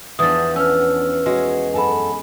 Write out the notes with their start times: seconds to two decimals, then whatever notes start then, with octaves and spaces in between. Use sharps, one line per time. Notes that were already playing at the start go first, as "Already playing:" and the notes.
0.19 E2 F3 B3 D4 D#6 A6
0.56 C#4 B4 E6 F6
1.26 G#3 F#4 C#5
1.74 F#2 A4 F#5 G#5 B5